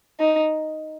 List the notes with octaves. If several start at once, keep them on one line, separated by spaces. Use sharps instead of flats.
D#4